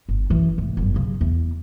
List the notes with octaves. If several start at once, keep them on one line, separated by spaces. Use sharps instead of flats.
G1
F#2 E3
F1 G#2
G1 F#2
C#3 F#3
E2